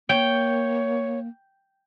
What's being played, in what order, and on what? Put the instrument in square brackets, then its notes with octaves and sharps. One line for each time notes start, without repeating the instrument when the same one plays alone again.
[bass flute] A#3 [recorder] C#5 [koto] G5